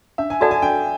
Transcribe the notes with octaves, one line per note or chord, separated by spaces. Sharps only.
D4 E5
G#5
F#4 A4 D5 F#5 A5
G#5
D4 G5